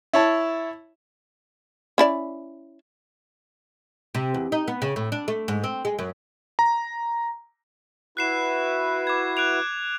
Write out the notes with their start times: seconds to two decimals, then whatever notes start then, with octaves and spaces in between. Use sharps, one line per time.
0.13 E4 C#5 A5
1.98 C#4 E4 D5
4.15 C3
4.34 E2
4.52 D#4
4.68 B3
4.82 C#3
4.96 A2
5.12 D4
5.28 A3
5.48 G#2
5.64 C4
5.85 G#3
5.99 F#2
6.59 A#5
8.17 E4 F#4 B4 F#6 C7 E7
9.07 D6 G#6
9.37 F#6 D7 F7